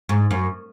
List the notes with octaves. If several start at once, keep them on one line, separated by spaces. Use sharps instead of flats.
G#2
F#2